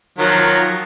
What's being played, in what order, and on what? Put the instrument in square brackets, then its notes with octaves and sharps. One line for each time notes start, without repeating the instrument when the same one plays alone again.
[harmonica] D#3 F3 F#3